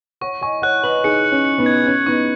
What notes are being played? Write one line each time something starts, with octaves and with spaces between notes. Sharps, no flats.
C#5 F#5 C#6
D#5 G#5 C#6
C#5 F#5 F#6
B4 D#5 F#7
D#4 G#4 C#7
C#7
C#4
C#7
B3 D#4
G#6
C#4 G#6
B3 D#4 C#6